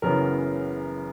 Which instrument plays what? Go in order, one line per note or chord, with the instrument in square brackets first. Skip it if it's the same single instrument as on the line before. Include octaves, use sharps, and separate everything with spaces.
[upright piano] F#1 F#2 C#3 E3 B3 A#4